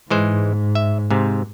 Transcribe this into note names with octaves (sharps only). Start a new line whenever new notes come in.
G#2 E3 G#3 C5
E5
G#2 C3